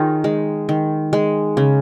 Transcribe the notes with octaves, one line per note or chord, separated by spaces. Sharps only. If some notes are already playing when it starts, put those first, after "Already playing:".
Already playing: D#3 D#4 F4 G#4 C#5
G#3
D#3
G#3
C#3